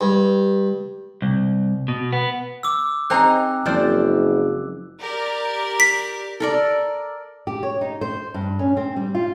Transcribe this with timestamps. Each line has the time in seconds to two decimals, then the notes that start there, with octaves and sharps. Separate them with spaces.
0.01 G2
1.22 C2
1.88 B2
2.13 B3
2.63 D6 E6
3.10 C4 D#4 G#4 C5 A#5 F#6
3.65 F#1 F3 G#3 C#4 C5 D5
4.99 G4 A#4 D5
5.80 B6
6.40 A4 A#4 D5
7.47 G4
7.63 C#5
7.81 D#4
8.01 C5
8.34 G2
8.59 C#4
8.77 C4
8.96 G3
9.15 F4